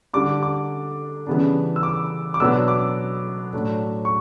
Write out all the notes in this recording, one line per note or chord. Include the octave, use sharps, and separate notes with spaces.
D3 G3 D4 D6
D6
C#3 E3 G3 B3 D4
E6
D6
D6
B2 F#3 B3 D4 E6
D6
A2 F#3 A3 D4
C#6